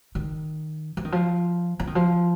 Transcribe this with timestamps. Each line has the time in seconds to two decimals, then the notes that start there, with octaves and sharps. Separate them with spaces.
0.15 D#3
0.97 F3
1.05 D#3
1.12 F3
1.80 F3
1.87 D#3
1.95 F3